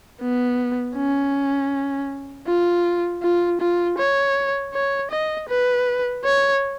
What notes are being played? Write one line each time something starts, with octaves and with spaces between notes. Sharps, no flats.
B3
C#4
F4
F4
F4
C#5
C#5
D#5
B4
C#5